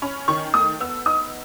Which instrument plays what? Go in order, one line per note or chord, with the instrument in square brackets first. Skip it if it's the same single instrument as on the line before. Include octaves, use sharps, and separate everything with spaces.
[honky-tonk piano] C#4 B5
D#3 C#6
A3 D#6
B3 E6
D#4 D#6